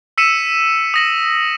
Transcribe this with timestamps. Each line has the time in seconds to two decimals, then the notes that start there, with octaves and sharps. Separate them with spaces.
0.18 E6 B6 C#7 D#7 E7
0.94 D#6 A#6 F#7